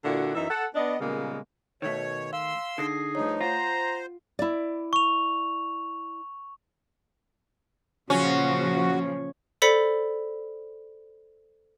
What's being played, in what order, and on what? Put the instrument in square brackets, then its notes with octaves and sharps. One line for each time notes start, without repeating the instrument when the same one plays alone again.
[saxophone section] A#2 D3 D4 E4 F#4
F#2 E3 D#4 E5
A4 F#5
B3 D4 D#5
A#2 C#3 G3 G#3 A#3 B3
[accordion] B2 C#5 [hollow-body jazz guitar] D#3 A3
[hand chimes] F5 [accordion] C6 E6
[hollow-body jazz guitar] D3 [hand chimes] D#4 A#6 C7 [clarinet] G#4
[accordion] G2 F3 D#4 [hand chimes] A3 C#5
[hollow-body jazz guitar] F4 [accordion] C5 [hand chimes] F#5 [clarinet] A#5
[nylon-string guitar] E4 D5
[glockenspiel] C#6 F7
[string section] A#2 C#3 F3 [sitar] C#4 [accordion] F#4
[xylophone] A4 C5 D5 B5 B6 C#7